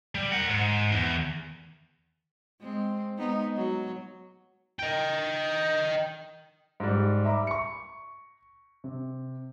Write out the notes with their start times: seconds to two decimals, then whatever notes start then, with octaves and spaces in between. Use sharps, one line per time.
0.15 G3
0.32 A#4 F#5
0.49 G#2
0.92 E2
2.60 G#3 C4
3.18 G#3 B3 D#4
3.56 F#3
4.79 D#5 G5
6.80 G#2 G3
7.25 E5 A#5 B5 D6
7.47 C#6 C#7
8.84 C3